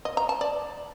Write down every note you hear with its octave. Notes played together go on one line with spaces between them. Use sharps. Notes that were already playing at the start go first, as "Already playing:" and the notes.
D#5
A#5
A5
D5